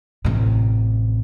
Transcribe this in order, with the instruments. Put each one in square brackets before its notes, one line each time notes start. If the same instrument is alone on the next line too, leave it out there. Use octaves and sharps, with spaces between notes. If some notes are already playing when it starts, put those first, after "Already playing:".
[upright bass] A1 C3